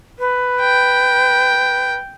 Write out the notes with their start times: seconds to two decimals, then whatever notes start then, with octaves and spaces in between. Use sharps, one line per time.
0.19 B4
0.61 G5